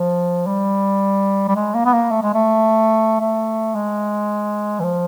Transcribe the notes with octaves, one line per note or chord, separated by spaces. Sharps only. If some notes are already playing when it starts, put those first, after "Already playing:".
Already playing: F3
G3
G3
G#3
A#3
B3
A#3
A3
G#3
A3
A3
G#3
E3
F3